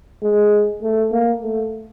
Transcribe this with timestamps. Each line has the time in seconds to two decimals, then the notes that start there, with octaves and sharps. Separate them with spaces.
0.23 G#3
0.82 A3
1.12 A#3
1.42 A3